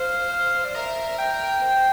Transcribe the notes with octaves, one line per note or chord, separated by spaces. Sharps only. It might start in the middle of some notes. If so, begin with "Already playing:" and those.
Already playing: C5 F5
F5
D5
A#4 E5
G5
C5